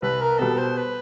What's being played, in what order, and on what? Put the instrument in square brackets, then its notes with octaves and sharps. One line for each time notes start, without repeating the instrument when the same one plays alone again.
[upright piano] C2 [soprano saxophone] B4
[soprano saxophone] A#4
[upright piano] B2 G3 B3 [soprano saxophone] A4
[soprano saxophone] C5
B4